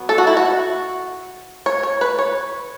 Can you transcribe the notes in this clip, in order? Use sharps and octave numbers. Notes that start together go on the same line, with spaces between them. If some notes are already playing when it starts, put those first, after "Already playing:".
Already playing: F#3 B3
A4
F#4
E4
F#4
C#5
C#5
B4
C#5